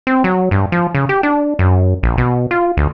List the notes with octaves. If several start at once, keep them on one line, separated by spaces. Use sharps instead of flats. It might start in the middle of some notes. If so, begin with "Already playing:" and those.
C4
F#3
G2
F3
C#3
G4
D4
F#2
A#1
B2
F4
D2